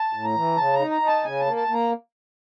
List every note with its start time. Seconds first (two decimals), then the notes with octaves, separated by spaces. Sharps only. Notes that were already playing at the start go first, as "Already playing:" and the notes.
Already playing: A5
0.13 A2
0.24 A#5
0.35 E3
0.57 C#3 A5
0.73 A#5
0.79 D#4
0.91 A#5
1.01 D#4
1.07 A5
1.24 C#3 G#5
1.40 A5
1.46 A#3
1.56 A5
1.68 A#3
1.73 A#5